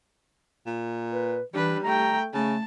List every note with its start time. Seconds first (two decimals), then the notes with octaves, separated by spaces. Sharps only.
0.66 A#2
1.12 B4
1.54 E3 G3 D4 B4
1.84 A3 G5 A#5
2.34 C#3 A3 A5